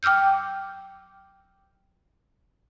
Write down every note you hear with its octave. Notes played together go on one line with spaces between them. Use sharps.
G5 D6 E6 F6 G6